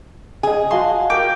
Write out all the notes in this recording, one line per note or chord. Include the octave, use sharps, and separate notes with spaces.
G#4 D#5 G#5
F#4 F5 A5 C6
G4 A#4 G5 D6 G6